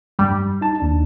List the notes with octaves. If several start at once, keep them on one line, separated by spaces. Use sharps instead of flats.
G2 G3
D#4 A5
D#2 D4